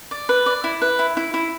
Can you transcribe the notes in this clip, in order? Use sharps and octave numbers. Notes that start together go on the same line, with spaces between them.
D5
B4
D5
E4
B4
E4
E4
E4